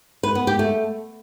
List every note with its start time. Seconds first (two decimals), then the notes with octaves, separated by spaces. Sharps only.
0.23 B4
0.35 B3
0.47 G4
0.59 A3